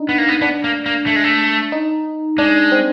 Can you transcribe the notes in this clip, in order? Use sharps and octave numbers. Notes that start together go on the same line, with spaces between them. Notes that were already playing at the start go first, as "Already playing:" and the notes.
Already playing: D4 D#4
B3
A#3
B3
B3 D4
A#3
A#3
A3
G#3
A3
D#4
G#3 D4
C4